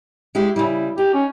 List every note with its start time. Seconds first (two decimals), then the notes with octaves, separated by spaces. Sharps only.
0.35 G#3 E4 G4
0.56 C#3 G3 E4
0.98 D#4 G4
1.14 C#4